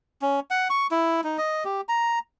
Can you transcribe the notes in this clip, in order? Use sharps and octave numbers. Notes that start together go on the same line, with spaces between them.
C#4
F#5
C#6
E4
D#4
D#5
G4
A#5